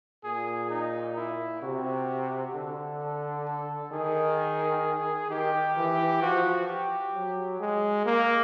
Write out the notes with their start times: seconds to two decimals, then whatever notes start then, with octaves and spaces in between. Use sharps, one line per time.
0.24 A#2 G#4
0.70 D#4
1.17 E4
1.62 C3 F#4
2.54 D3 A4
3.01 A4
3.47 A4
3.92 D#3 G#4
5.30 D#3 G4
5.76 E3
6.21 F3 F#4
6.68 G4
7.15 F#3
7.60 G#3 G#4
8.06 A#3